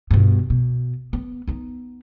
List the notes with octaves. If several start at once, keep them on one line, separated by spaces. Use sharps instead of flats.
G2 B2
B2
B3
B3 D#4